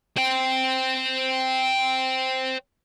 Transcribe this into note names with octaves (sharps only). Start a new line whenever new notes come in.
C5 G5